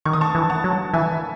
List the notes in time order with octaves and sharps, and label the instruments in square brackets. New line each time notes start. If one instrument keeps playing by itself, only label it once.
[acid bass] D#3 [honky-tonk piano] C#6
[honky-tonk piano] D#6
A5 C#6
[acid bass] E3
[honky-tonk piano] F#5 A5
[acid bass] F#3
[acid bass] E3 [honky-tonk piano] E5 G#5